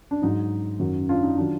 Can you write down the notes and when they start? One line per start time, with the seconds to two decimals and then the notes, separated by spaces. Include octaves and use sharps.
0.11 D4
0.22 G#2 F#3 D#4
0.80 F#2 D#3 F#3
1.09 D4 F4
1.23 D#4
1.38 D#3 F#3 D4 F4